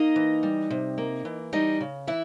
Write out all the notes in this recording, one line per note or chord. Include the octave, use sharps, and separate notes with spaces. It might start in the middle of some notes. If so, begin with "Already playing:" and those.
Already playing: A#3 D#4 D#5
E3
G3
C3
A#3
E3
G3 D#4 D#5
C#3
E3 E4 E5